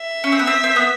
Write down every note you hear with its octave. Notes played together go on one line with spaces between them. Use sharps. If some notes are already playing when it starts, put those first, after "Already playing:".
Already playing: E5
C#4
C4
B3
C4
C4
B3